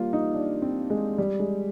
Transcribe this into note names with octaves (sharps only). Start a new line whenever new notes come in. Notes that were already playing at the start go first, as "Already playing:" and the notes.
Already playing: G3 A#3 F4
D#4
D4
C4
G#3
G3
G#3